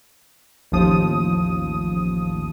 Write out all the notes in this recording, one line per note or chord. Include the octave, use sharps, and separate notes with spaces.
A1 D#2 F3 D#6